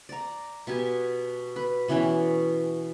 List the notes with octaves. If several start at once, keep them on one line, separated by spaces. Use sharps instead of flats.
D5 A#5
B2 G4 G#5
B4 B5
B2 E3 C#4 G5